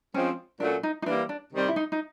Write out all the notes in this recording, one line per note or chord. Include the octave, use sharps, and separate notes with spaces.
F3 G#3 C4 C#4
A#2 F#3 A3 C#4 D4
D#4
D#4
E3 G3 A#3 D4
D4
C3 D#3 G3 C4
E4
D#4
D#4